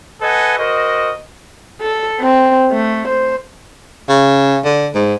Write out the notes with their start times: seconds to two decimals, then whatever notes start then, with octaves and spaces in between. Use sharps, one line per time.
0.22 A4 B4 D#5 F#5 G#5
0.59 F#4 A#4 C5 D#5
1.81 A4
2.20 C4
2.71 A3
3.08 C5
4.09 C#3
4.65 D3
4.95 G#2